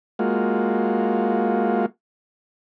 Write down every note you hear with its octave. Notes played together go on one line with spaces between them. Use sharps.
G#3 A#3 F4 F#4